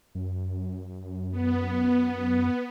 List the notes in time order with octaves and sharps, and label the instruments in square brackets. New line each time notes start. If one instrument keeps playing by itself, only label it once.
[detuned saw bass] F#2
[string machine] B3